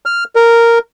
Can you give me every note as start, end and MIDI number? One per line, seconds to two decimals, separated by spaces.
0.06 0.24 89
0.36 0.79 70